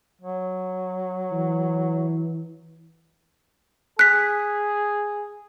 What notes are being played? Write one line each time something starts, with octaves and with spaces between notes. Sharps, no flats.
F#3
E3
G#4 F#6 B6